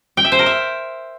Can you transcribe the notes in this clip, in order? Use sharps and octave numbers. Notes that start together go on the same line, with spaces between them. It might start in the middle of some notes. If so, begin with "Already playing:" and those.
G5
E5
C5
A#4
E5